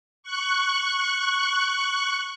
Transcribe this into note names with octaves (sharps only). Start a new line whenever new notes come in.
C#6 F#6